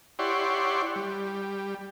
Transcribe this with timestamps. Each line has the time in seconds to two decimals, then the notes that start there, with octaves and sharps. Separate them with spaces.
0.19 E4 G4 C#5 D5 F#5 C6
0.96 G3